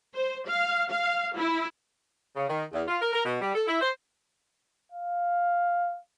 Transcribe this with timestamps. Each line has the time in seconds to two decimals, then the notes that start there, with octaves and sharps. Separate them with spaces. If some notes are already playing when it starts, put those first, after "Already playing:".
0.14 C5
0.47 F5
0.90 F5
1.37 E4
2.36 C#3
2.49 D#3
2.73 E2
2.88 F4
3.01 A#4
3.13 A#4
3.26 B2
3.42 G3
3.55 A4
3.68 E4
3.81 C5
4.92 F5